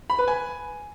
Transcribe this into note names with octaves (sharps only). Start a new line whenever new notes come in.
B5
B4
G#5